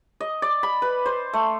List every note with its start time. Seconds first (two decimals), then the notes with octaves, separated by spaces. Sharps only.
0.21 D#5
0.42 D5
0.63 B5
0.82 B4
1.06 C5
1.33 A3